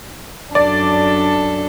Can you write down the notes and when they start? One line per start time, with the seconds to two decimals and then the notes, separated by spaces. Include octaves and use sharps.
0.55 F#2 D4 A4 D5